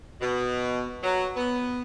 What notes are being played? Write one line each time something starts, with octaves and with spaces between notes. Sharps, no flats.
B2
F#3
B3